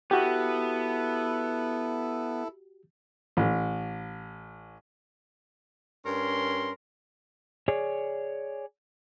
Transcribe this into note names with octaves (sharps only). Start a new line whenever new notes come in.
B3 E4 F#4 G4 A4
A1
G2 C#4 A#4 C6
G#4 C#5 D5